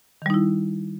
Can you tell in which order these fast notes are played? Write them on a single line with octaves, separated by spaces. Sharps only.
D#3 G3 D#4 E4